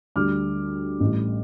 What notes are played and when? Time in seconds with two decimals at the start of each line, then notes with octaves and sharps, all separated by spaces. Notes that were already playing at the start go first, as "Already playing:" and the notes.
0.16 D2 D3 G3 D6 F6
1.00 A1 A2 G3